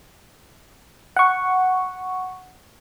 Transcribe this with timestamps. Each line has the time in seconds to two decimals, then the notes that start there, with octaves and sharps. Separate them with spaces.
1.17 F#5 C#6